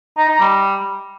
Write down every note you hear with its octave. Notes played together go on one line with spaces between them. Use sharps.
D#4
D#4
G3